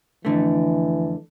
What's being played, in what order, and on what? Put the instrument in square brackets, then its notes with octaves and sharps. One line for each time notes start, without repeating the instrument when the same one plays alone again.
[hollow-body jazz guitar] F2 D3 A3 [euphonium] E3